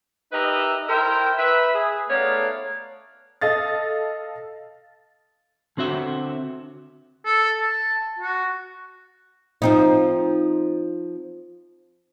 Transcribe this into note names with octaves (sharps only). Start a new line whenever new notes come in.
D#4 G4 A#4 B4 D#5 E5
E4 A#4 C5 E5 G5
B4 E5
G#4
A3 B3 D#4 C#5 D5 F5
A4 D#5 F5 A6
D3 C4 F#4 E5
A4
A5
F#4
F3 C4 D#4